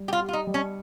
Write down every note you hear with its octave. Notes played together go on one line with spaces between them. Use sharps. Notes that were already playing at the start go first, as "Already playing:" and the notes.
Already playing: G3
G4
F4
G4
F4
D#4
G3
C#4